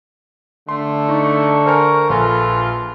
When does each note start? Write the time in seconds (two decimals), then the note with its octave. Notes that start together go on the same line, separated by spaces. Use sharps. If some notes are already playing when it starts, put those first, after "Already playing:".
0.69 D3 A3 C6
1.09 D#4 C#6
1.66 A#4 C5 G#5 F6
2.10 A#1 F4 A4 B4 G#5